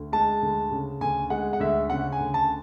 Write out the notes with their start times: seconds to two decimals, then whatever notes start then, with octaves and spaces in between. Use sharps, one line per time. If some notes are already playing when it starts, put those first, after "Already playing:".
Already playing: D2
0.12 G#3 A5
0.42 D2
0.71 C#3
1.01 D2 G#5
1.30 G#3 F#5
1.53 F#5
1.60 D2 E5
1.90 C#3 F#5
2.12 G#5
2.20 D2
2.34 A5